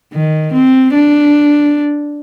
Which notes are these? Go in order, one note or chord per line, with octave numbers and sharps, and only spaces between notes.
D#3
C4
D4